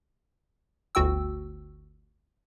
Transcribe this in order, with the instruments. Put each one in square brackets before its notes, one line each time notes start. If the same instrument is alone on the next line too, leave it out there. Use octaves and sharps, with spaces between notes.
[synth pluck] G1 D2 F#4 G5 E6